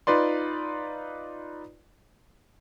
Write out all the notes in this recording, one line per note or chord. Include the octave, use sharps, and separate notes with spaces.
D#4 F4 B4 D5 C6